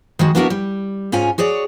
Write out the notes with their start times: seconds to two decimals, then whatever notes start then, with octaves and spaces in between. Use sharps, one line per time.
0.19 D#3 G#3 F#4
0.35 A#3 B3 D4 E4 F#4 A#4
0.50 G3
1.12 G#2 C#4 F4 G#5
1.38 F#4 G#4 C#5 D5